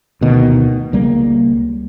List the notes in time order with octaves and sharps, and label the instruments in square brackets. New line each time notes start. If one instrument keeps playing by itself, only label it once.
[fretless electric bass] D2 B2 D#3
C#2 G3 A#3